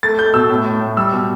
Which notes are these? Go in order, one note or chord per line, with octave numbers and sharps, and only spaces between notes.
A3 A6
A3 G6
B2 E6
A2
A2
A2
G3 E6
B2